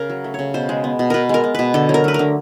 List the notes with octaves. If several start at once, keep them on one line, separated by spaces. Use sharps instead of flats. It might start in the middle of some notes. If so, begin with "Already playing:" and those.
Already playing: C#3 A#4
F#3
A3
C#3 C#5
B2 C5
G#3
B3
B2
B2 A#4 B4
G#3 A#4
B3
B2 B4
D3 A4
F#3
A#4
A3 B4
D3 A#4